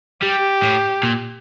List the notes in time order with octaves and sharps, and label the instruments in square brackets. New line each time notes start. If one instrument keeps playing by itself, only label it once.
[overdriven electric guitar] G3 [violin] G4
[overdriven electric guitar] A2
A#2